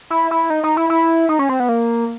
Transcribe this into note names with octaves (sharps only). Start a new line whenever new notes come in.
E4
E4
D#4
D#4
E4
E4
D#4
C#4
C4
B3
A#3